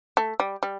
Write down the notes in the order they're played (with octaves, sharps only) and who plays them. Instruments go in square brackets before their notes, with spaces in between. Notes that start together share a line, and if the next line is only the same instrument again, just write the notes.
[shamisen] A3
G3
G3